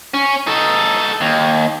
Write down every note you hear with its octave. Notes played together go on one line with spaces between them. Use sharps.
C#4
D#4 A4
D#2